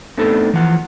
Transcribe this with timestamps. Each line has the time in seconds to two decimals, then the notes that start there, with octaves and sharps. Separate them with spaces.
0.18 A3 B3 C4 D4 D#4 A4
0.53 E3 F3 F#5